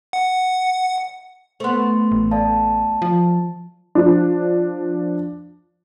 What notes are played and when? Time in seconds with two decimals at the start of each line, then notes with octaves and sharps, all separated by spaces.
0.13 F#5
1.60 A3 B3 C5 C6
2.12 A1
2.31 A4 D5 F5 A5
3.02 F3
3.95 F3 D4